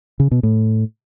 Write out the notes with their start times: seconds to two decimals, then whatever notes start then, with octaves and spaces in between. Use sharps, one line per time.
0.20 C#3
0.31 B2
0.43 A2